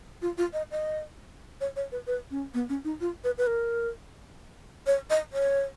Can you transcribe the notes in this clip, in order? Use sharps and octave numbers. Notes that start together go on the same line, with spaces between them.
F4
F4
D#5
D#5
C#5
C#5
B4
B4
C#4
B3
C#4
D#4
F4
B4
B4
A#4
C#5
D#5
C#5